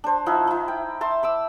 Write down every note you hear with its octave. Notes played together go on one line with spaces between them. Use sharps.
D4 C5
F3 D#4 E4 F#5
D#4 E4
G5
E5 A5 C6
B5 D6 E6